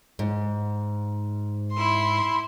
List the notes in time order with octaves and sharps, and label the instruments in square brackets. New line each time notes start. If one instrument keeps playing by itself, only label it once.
[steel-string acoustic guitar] G#2
[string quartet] E4 C6